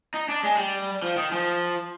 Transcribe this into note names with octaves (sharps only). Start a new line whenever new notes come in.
D#4
D4
G#3
G3
F3
D#3
F3